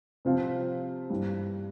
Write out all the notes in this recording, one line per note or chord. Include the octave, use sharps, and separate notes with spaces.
C3 F3 C4 F4
G2 E3 G3